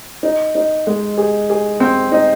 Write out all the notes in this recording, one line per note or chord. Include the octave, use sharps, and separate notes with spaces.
D#4
D#4
G#3
G#4
G#4
C4
D#4